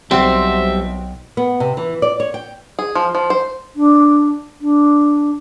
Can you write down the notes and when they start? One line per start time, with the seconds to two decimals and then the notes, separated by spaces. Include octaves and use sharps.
0.11 B1 G3 C4 F#4 C5 E5
1.37 B3
1.60 C3
1.77 E3
2.02 D5
2.20 C#5
2.34 G5
2.79 G#4
2.95 F3
3.15 F3
3.30 C5
3.76 D4
4.61 D4